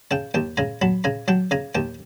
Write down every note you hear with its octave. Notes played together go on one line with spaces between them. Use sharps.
C#3 G5 A5
D#2 G5 A5
C#3 G#5 A#5
F#3 A5 B5
C#3 G#5 A#5
F#3 G5 A5
C#3 G#5 A#5
D#2 G5 A5